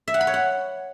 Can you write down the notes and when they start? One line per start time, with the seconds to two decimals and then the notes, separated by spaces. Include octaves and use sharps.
0.08 E5
0.14 F#5
0.21 B5
0.27 C#5
0.34 F#5